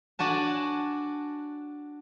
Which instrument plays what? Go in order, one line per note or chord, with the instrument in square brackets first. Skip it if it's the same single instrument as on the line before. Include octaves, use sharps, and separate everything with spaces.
[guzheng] D4 F#4 G#5 A5